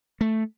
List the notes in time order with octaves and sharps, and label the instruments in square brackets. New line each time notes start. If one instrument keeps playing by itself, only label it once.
[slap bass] A3